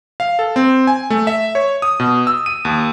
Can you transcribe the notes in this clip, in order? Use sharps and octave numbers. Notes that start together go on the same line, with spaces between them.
F5
A4
C4
G#5
A3
E5
C#5
D#6
B2
E6
D#7
D#2